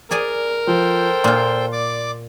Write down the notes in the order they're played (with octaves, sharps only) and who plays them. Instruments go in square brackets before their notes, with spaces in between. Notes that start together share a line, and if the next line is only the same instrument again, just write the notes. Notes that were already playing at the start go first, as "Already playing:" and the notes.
[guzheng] G#4 D5 G#5 [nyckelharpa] A#4
[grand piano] F3 [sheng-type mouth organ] A4 C5 G5
[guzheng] A#2 F4 [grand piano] C6
[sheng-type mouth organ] D5 D6